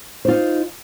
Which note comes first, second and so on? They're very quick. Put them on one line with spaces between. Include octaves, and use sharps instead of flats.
C5 F4 D#4